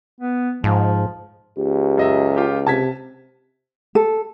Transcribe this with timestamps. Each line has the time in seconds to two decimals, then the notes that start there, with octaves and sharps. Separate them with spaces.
0.21 B3
0.64 G#2 F3
1.58 C#2 G4
1.98 F#2 D#5 E5
2.37 F4 G4
2.67 C3 A5 G#6 B6
3.95 A4